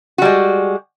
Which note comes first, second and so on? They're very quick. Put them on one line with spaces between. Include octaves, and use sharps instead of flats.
F#4 G3 G#3